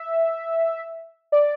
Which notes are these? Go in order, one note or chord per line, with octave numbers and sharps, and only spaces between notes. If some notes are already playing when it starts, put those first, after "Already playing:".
Already playing: E5
D5